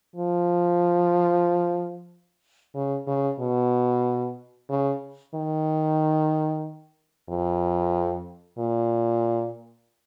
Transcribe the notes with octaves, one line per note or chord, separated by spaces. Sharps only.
F3
C#3
C#3
B2
C#3
D#3
F2
A#2